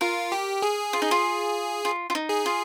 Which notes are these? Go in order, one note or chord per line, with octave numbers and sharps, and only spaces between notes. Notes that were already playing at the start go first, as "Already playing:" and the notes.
F4 A#4
G4
G#4
F4
D#4
F4
F4
F4
D#4
G#4
F4